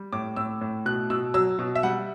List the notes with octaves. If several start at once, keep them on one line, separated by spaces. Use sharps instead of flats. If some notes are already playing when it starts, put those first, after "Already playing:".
Already playing: G3
A2 D6
A2 E6
A2
B2 F#6
B2 E6
F#3 E6
B2
E5
G3 F#5